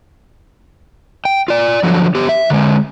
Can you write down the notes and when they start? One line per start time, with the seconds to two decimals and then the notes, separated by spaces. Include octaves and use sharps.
1.25 G5
1.48 F4 D5
1.83 D3 F3 F#3
2.15 B3 G4
2.29 E5
2.50 D3 G#3